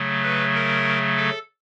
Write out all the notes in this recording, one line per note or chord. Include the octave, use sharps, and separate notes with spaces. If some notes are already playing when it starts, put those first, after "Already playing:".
Already playing: C#3 F#3 A3
B4
A#4
A4